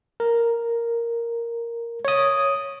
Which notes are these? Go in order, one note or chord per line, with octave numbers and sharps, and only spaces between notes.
A#4
C#5 D#6